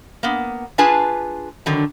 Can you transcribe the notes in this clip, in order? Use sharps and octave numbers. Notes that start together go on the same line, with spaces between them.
A#3 B3
D4 F4 G#4 B4 G#5 A5
D3 D#3 F#3